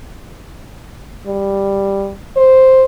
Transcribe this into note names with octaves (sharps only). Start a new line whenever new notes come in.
G3
C5